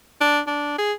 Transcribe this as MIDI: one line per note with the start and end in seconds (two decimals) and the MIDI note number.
0.20 0.40 62
0.47 0.73 62
0.78 0.92 68